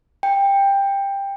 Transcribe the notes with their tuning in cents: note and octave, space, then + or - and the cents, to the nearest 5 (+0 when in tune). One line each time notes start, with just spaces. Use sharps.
G5 +15